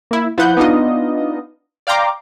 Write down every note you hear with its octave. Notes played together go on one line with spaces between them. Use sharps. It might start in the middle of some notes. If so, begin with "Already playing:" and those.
A#3 E4
F3 E4 B4 F#5 G6
B3 D4 D#4 F4 D#5
D5 F5 G5 A#5 C6 D6